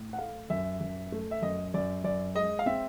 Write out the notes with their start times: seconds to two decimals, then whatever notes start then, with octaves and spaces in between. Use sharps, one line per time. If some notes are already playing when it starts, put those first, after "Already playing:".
Already playing: A2
0.13 F#5
0.18 A3 F5
0.50 F#2 E5
0.80 F#2
1.12 A3
1.31 E5
1.42 F#2 D#5
1.74 F#2 D5
2.04 F#2 D5
2.35 G#3 D#5
2.59 F5
2.66 C4 E5